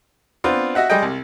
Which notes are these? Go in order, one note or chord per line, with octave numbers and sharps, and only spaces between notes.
B3 C4 D4 F4
F#4 D#5 E5 F#5
G3 G#3 G#4 D#5 G5
C2